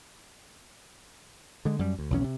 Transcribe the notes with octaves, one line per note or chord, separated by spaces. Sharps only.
D3 G#3
F#2 G3
D2
B1 E2 C#4
C3